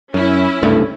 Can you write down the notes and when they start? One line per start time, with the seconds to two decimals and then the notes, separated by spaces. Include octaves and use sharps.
0.14 F#2 C#4 E4
0.62 F#1 C2 G2 A3